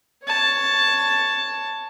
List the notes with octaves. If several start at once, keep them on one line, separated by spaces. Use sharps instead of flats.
C#5 A5